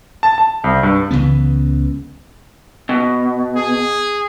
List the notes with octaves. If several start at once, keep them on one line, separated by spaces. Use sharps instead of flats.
A5
A5
C2
G2
C#2 C#3 E3 B3
B2
G#4